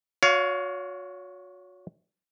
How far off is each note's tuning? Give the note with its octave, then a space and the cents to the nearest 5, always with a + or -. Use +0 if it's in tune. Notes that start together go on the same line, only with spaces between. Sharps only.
F#4 -35 C#5 +25 F5 +0